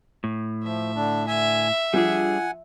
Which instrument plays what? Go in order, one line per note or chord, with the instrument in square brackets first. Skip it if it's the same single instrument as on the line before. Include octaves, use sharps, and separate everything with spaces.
[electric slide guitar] A2
[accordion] F3 [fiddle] E5
[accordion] D3 D4
[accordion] D3 G#5 [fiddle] E5
[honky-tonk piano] F3 [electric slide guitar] G3 D4 G#4 [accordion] F#5 G#5